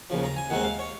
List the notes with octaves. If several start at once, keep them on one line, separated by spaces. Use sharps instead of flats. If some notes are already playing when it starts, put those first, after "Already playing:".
D#2 C#3 F3
A#5
G#5
D#2 D#3 G#3 C4 F#5
F5
C#5